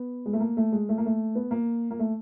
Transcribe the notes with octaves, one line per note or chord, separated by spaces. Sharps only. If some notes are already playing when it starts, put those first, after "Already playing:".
Already playing: B3
G#3
A3
A#3
A3
G#3
A3
A#3
A3
B3
A#3
A#3
A3